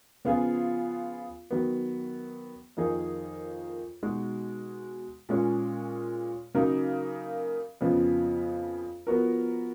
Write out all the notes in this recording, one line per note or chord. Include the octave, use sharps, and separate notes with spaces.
C#3 F3 B3 F4 G#4
D#3 F#3 B3
F2 D#3 A#3 D#4 G#4
B2 G#3 D#4 F#4
A#2 G#3 C#4 G#4 C#5
C#3 F#3 A#3 D#4 A#4
F2 C#3 F3 B3
F3 B3 F#4 A#4